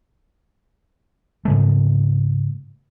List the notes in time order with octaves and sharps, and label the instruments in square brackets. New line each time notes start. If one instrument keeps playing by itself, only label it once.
[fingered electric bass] G#2 C#3 A3